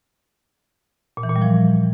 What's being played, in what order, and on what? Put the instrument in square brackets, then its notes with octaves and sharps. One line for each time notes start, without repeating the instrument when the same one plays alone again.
[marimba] A#2
E3
A#2
G3
F3